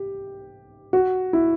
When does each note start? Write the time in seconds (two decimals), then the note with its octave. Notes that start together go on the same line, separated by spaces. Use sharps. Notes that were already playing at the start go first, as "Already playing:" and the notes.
Already playing: G4
0.93 F#4
1.33 E4